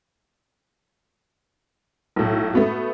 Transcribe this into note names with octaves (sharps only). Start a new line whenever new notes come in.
B1 A2
A3 B3 F#4